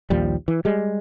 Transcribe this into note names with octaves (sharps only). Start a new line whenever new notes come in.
A#1 D#2 F3 G3
E3
G3 G#3